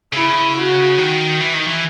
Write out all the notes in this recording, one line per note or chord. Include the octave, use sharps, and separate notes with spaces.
C#3 E4
F#4
D#3
E3
D#3
E3